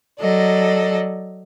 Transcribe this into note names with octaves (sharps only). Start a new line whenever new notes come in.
F#3 A4 D5 D#5